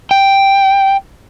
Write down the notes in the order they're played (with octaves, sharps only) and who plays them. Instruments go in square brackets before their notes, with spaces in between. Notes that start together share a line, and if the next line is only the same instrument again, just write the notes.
[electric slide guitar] G5